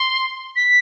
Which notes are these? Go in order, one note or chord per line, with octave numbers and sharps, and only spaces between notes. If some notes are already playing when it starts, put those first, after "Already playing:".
Already playing: C6
B6